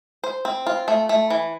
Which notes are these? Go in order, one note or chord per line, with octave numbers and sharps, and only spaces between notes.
C5
C4
F4
A3
A3
E3